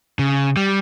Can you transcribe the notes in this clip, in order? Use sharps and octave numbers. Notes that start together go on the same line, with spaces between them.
C#3
G3